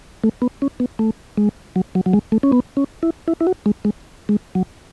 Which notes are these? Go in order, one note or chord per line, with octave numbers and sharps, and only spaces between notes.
A3
B3
C#4
B3
A3
G#3
F#3
F#3
F#3
G#3
A3
C#4
B3
C#4
E4
E4
E4
F#4
G#3
G#3
G#3
F#3